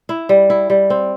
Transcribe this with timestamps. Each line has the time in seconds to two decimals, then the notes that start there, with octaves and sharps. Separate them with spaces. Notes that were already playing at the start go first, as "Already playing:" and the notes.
0.09 E4
0.29 G3
0.50 E4
0.70 G3
0.90 C4